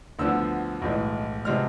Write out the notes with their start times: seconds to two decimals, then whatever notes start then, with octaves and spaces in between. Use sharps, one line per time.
0.19 D2 D3 F3 B3 E6
0.82 B1 A2 E3 G#3
1.45 C3 F3 G#3 B3 F6